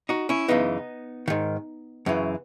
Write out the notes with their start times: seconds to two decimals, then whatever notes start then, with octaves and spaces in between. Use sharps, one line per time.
0.09 D#4 F#4
0.29 C#4 E4
0.48 F#2 C#3 E3 B3 D#4
1.28 G#2 D#3
2.06 F#2 C#3 E3